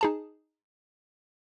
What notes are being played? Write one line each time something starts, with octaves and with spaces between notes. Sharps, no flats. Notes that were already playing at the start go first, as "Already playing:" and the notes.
D#4 G#4 A5